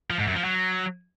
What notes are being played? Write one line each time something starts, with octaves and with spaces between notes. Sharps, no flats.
F3
G#2
F#2
F3
F#3